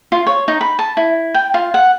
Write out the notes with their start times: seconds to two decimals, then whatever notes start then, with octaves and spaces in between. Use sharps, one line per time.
0.12 F4
0.27 C#5
0.48 D#4
0.61 B5
0.79 A5
0.97 E4
1.34 G5
1.54 F4
1.74 F#5